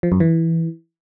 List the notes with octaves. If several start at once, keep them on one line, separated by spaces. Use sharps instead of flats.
F3
F#2
E3